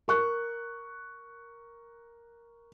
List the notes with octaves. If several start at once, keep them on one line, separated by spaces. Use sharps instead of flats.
A#4 C#6 F#6